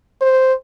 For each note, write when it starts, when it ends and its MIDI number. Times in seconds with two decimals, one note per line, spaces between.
0.21 0.53 72